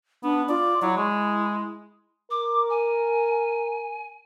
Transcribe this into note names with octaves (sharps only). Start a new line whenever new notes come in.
B3 D4
F4 D5
F#3 E4
G#3
A#4 D6
G#5